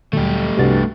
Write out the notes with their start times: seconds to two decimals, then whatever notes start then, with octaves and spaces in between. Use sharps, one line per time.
0.13 D2 A#2 D3 F#3 G3 A3 G4
0.58 C2 G2 C3 D4 F#4 A6